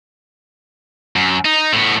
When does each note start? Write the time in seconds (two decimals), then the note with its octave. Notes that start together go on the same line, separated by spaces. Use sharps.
1.16 F#2
1.45 D#4
1.73 A2 B3